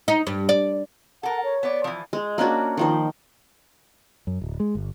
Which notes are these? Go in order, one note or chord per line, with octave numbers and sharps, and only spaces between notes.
D#4
G2
D5
A4 A#4 F#5
C#5
B3 D5
E3 F3
G#3
A#3 C#4 D4 F#4
D#3 F3 C5
F#2
D1
G#3
G1